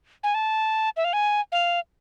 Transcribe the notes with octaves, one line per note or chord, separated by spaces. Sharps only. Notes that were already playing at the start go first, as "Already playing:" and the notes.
G#5
A5
E5
F5
G#5
F5